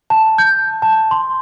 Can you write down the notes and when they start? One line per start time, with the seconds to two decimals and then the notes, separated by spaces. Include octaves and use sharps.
0.10 A5
0.38 G6
0.82 A5
1.11 C6